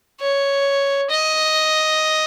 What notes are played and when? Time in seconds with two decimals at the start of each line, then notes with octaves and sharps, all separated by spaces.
0.21 C#5
1.11 D#5